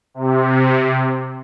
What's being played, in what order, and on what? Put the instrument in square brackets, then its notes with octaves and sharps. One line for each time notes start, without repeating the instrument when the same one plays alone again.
[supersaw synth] C3